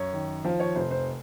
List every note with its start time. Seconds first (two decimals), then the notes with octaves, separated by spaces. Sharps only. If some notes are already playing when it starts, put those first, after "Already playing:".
Already playing: F#2 C#5
0.13 D#3
0.44 F3 F5
0.60 C#5
0.75 F1 C5
0.91 C5